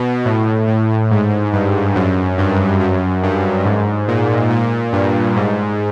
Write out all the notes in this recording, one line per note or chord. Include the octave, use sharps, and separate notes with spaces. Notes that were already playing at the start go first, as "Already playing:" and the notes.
Already playing: B2
A2
A2
G#2
G2
F#2
G2
F#2
G2
G#2
A#2
A#2
G2
G#2